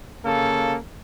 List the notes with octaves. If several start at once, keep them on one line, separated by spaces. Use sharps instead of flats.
C#3 A#3 A4